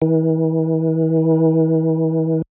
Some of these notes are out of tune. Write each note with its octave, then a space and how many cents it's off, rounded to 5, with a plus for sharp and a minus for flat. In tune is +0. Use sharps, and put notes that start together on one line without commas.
E3 -40